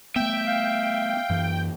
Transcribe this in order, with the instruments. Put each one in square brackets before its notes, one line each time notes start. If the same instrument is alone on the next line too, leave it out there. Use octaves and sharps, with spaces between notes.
[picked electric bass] A3 B3 [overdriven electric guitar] E5 [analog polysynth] G5
[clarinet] F5
[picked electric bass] F#2 E3